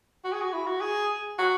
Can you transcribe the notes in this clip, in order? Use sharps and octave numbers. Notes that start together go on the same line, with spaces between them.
F#4
G#4
F#4
E4
F#4
G#4
F#4